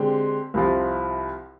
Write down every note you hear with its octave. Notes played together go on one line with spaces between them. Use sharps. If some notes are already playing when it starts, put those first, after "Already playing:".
Already playing: D3 G#3 C4 G4
C2 C3 F3